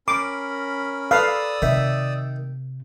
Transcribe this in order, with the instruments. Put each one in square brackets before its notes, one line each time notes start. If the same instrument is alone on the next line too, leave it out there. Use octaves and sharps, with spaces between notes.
[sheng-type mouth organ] C#4 A#4 B5 [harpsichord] C6 [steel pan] D6
[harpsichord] A4 B4 [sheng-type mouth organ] D5 D#6 E6 [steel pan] F5
[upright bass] C3 [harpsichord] D#3 E5